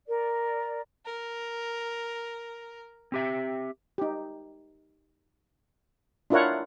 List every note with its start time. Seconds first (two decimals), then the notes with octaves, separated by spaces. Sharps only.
0.08 A#4 D5
1.05 A#4
3.12 C4 G4 E5
3.98 D#4 G4
6.30 D4 E4 F4 A#4 C#5 F#5